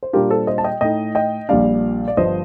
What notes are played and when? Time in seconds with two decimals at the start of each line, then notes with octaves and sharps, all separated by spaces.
0.03 C5
0.13 A#2 G3 D4 F4 G4 A#4
0.30 A4 C5
0.47 C5 D#5
0.58 A5
0.64 D#5 G5
0.81 A2 A3 D#4 D#5 G5
1.15 D#5 G5
1.49 A#1 A#2 G3 D4 D5 F5
2.08 D5
2.17 G1 G2 F3 C5 D#5